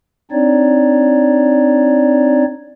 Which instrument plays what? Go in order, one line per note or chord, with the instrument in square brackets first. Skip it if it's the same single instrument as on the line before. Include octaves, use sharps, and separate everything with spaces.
[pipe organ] C4 D4 D#4 C#5 D5